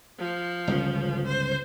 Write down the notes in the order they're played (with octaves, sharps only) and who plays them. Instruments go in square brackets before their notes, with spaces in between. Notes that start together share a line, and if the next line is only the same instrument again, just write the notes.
[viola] F3
[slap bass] G1 C#2 C#3
[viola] C5